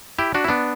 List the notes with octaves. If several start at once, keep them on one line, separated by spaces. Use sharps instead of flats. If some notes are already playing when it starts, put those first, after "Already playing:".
E4 G4
D4 F#4
E4
B3 D4